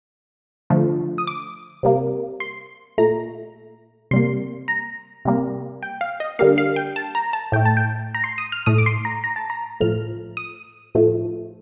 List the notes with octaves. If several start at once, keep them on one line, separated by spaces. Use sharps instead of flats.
D3 F3 A3
D#6
D6
C3 G3 A#3
C6
A#2 A3 A#5
C3 G3 A#3 C6
A#5
C3 G3 A#3
G5
F5
D#5
D3 G3 A#3 F5
F5
G5
A5
A#5
A5
A2 A3 G5
A5
G5
A#5
C6
D#6
F6
A2 A3 D#6
D6
C6
A#5
A#5
A5
A#5
A2 F3 A3 F6
D#6
A2 F3 A3